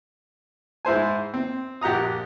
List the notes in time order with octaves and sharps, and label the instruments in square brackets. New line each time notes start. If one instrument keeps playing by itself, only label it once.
[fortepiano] G#2 E4 C5 G#5
C4
A#1 G4 F#5 A#5 D#6